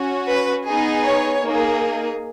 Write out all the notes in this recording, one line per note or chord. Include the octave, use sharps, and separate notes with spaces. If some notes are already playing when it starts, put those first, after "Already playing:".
Already playing: C#4 F#4
B4
B3 D#4 G#4
C#5
A#3 D#4 G#4